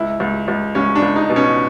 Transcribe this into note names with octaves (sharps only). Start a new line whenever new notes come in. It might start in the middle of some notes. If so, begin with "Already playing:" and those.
Already playing: C#2 E4
C#2
C#2
C#2 C#4
D4
C#2
D#4
B2
C#4